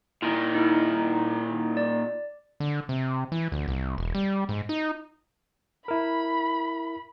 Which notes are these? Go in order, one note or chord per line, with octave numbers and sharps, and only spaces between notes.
A#2 D#3 E4
D#4 E4
D5
D3
C3
E3
D2
C2
E1
G3
G#2
D#4
E4 A#4 B5